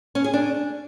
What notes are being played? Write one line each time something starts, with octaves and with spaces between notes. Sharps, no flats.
C#4
G#4
D4